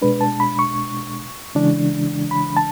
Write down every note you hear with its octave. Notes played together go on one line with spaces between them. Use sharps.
B2 G#3 D4 B4
A5
B5
C#6
C#3 E3 G#3 D4
B5
A5